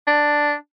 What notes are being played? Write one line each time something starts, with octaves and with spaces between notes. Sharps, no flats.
D4